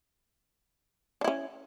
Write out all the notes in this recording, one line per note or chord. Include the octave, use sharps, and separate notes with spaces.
C#4 D4 E4